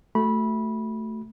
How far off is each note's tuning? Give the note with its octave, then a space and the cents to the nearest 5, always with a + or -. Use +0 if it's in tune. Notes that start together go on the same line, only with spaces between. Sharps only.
A3 +0 F#4 +0 B5 -20